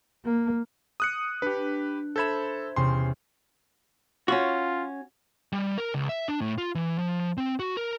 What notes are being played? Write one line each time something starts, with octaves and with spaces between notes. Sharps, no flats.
A#3
D#6 F#6 C#7
D4 G4 B4
A4 C5 E5 B5 G#6 E7
E2 C3 C#4 C6
C#4 F4 F#4
G3
A#4
C#2
E5
D4
A2
F4
E3
F3
C4
F#4
A#4